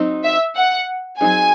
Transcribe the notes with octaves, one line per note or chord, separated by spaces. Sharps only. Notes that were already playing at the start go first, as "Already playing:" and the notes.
Already playing: F#3 C4 D#4
E5
F#5
F#3 C4 D#4 G#4 G#5